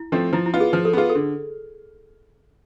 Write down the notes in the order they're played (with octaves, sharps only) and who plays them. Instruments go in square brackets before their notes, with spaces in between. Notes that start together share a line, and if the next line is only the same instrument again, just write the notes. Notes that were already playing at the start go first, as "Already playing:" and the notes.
Already playing: [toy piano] E4
[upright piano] F3 A3 C4
[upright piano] F3 [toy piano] E4
[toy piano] E4
[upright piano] B3 F4
[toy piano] G#4
[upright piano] F3 [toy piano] B4
[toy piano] A4
[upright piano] B3 F4 [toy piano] G#4
[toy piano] A4
[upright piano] D3